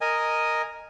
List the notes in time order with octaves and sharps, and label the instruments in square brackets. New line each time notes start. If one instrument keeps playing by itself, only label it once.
[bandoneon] A#4 D#5 G#5